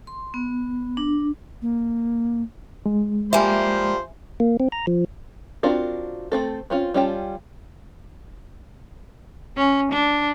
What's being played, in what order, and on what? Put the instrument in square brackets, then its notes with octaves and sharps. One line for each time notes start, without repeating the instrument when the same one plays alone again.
[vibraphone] C6
B3
D4
[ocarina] A#3
[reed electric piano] G#3
[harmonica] F3 C5 C6 [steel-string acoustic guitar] G3 A#3 [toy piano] E5 G#5
[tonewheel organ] A#3
C4
A#5
F3
[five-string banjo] C4 D4 F4 F#4 A#4
A3 C4 A4
C4 C#4 F4
G3 C#4 F4 G5 A5
[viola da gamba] C#4
D4